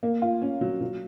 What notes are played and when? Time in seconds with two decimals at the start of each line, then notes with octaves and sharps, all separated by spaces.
0.03 A#3
0.22 F4
0.42 C#4
0.61 F#3
0.81 F#3